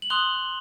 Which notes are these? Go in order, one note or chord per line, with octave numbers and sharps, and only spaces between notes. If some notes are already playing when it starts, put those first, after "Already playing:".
F#7
C6 D#6 F#6 F7 G7